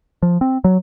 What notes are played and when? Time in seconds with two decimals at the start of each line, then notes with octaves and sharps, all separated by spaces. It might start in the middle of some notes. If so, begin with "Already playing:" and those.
0.23 F3
0.41 C4
0.64 F#3